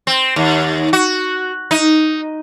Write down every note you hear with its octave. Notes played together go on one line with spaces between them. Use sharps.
C4
D#2
F#4
D#4